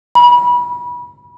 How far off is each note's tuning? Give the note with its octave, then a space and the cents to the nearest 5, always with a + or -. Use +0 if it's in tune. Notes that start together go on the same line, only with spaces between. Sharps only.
B5 -30